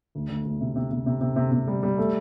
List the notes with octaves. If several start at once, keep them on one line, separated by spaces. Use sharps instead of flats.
D2
D2
D2
C3
C3
C3
C3
C3
C3
C3
G3
G3
A3